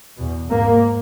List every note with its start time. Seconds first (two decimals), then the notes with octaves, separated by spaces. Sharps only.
0.17 E2 B2
0.50 G#2 A#3